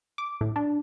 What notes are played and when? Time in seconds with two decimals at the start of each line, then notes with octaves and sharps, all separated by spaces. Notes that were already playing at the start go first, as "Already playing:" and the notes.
0.18 D6
0.41 A2
0.56 D4